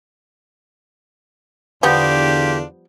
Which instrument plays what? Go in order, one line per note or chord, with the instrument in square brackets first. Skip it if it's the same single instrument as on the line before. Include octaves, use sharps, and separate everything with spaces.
[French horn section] E2 D3 [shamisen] F3 G3 B3 [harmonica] D4 F4 [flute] G4